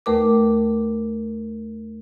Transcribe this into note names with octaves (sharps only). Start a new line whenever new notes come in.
D#2 A3 A#4 B4 D6